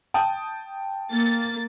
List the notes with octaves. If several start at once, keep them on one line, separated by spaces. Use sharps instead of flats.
G5 A5 D#6
A#3 A6